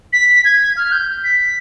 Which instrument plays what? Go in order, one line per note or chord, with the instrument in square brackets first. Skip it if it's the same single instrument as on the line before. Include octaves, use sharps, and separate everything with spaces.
[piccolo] B6
G#6
F6
G6
B6